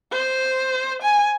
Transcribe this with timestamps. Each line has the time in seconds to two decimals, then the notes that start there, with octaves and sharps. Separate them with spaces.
0.12 C5
1.02 G#5